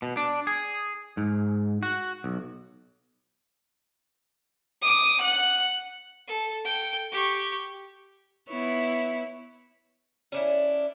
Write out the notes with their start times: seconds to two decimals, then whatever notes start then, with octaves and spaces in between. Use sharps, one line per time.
0.02 B2
0.17 D4
0.47 G#4
1.17 G#2
1.83 F#4
2.24 B1
4.82 D6 D#6
5.22 F#5 F#6
6.28 A4
6.65 A4 G5
7.12 G4 C#6
8.49 B3 E4 C#5
10.32 C#4 D4 E4